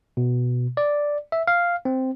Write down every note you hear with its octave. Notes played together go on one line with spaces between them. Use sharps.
B2
D5
E5
F5
C4